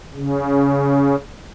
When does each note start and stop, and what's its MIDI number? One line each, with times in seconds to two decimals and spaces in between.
0.15 1.16 49